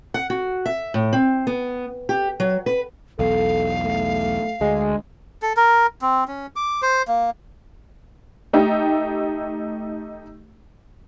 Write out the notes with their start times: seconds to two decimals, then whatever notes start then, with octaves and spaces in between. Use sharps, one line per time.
0.14 F#5
0.30 F#4
0.66 E5
0.94 A2
1.13 C4
1.47 B3
2.09 G4
2.40 F#3
2.66 B4
3.19 B1 E2 A4 F5
3.84 A3
4.61 D2 G#3
5.42 A4
5.57 A#4
6.02 C4
6.28 C#4
6.56 D6
6.82 C5
7.08 A#3
8.53 A3 D#4 G4